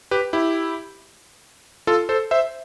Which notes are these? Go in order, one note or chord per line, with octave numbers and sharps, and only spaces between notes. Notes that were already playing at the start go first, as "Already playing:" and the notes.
G4 B4
E4 G4
F4 A4
A4 C5
C5 E5